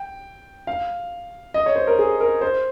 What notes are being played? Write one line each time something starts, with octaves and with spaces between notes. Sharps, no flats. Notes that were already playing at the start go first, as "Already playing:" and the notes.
Already playing: G5
F5
D#5
C#5
C5
A#4
G#4
A#4
C5